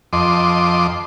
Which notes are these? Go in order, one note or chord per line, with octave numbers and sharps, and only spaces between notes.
F2 D#5 C6 D6